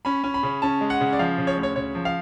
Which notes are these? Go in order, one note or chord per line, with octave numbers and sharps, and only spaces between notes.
C#4 B5
C#4
B5
C#3
C#4 A5
G#3
F#5
C#3
D5
F3 F5
C#3
C#5
D2
C#5
C#3 C#5
F3
F5